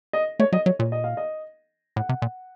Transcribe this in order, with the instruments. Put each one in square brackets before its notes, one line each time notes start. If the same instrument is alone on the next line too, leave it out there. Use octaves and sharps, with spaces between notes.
[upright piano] D#5
[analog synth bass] A3 [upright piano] C#5
[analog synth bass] F#3 [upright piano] D#5
[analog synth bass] F#3 [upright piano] C#5
[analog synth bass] A#2 [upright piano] C#5
[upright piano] D#5
F5
D#5
[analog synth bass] A2 [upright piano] F#5
[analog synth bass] C3
A#2